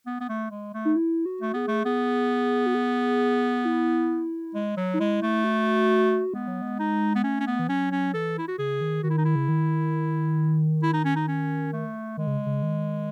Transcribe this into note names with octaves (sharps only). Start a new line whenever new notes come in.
B3
B3
A3
G#3
A3
D#4
E4
F#4
A3
B3 G#4
A3
B3 G#4
F#4
G#4
E4
G#3
F#3
D#4
G#3 E4
A3
F#4
G#3 B3
F#3
G#3
D#4
B3
A3 C#4
C#4
B3
E3
F#3 C#4
C#4
E3 A4
E4
F#4
C#3 G#4
D#3
D#3 F#4
E4
D#4
E4
C#3
D#3
E4
D#4
C#4
D#4
C#4
A3
D#3 G#3
C#3
C#3
D#3